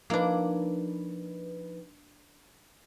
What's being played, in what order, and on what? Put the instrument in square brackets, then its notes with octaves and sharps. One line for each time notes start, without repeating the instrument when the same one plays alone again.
[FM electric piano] F3 D#4 B4 [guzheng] A#3 D4